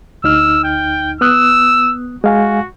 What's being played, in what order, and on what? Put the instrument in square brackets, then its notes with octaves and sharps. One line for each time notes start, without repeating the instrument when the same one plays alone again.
[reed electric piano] D2 D#4 F6 [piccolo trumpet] E6
[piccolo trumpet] G5
[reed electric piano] B3 D#6 F#6 [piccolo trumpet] E6
[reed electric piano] G#3 F5 G#5 [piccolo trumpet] F#4